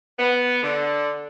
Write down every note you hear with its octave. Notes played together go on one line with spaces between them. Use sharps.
B3
D3